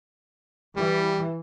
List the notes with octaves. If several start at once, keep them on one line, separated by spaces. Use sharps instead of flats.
E3 G3